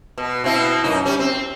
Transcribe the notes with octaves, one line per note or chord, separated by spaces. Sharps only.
B2
B2 C4 E4
F#2 A2 D#4
G3 C#4
C4